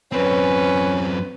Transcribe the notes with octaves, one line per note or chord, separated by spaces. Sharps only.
F#2 C4 C#4 B4